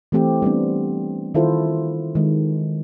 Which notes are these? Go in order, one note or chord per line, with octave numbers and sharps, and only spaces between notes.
E3 A3 C4 G4
G3 B3 C4 D4
D#3 E4 F4 A4 C5
D#3 G#3